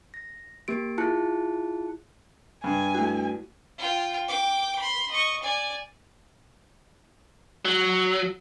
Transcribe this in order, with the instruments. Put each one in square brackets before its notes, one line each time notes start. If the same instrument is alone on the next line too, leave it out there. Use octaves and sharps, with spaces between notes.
[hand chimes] A#6
A#3 G4 D7
E4 F4 G#4 A5 F#6 C#7
[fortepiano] G2 [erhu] G#5
[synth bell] A3 E4 F#4
[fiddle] F4 G5
G5 D6
B5 C6
D#5 C#6
D5 G#5
[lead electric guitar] F#3